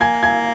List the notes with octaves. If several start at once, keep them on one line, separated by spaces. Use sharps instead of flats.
A#3 G#5 G#6
G#5 G#6